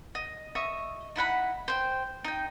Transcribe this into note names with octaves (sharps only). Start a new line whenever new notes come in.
D#5
D#5 E5 C#6
D#4 E4 F#5 B5
C5 G5
D#4 G5